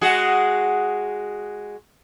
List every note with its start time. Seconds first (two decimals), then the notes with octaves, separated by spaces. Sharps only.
0.01 G#3 F#4 G#4